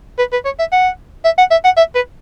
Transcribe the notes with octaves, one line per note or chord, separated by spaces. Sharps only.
B4
B4
C#5
E5
F#5
E5
F#5
E5
F#5
E5
B4